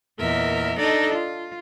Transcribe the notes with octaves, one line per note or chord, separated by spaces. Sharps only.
E2 A#2 A#4 D#5 E5
D4 D#4 A4 D5 D#5
F4